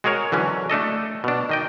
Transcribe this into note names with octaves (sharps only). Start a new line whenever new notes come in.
G#3 F#4 G#4 A#4 C#5
D3 E3 F#3 C#4
A3 D4 A4 D#5
B2 D4
D#3 D#5 G5